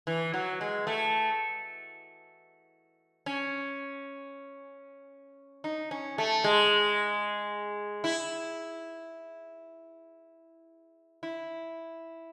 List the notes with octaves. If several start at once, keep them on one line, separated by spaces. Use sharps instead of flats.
E3
F#3
G#3
A3
C#4
D#4
C#4
A3
G#3
E4
E4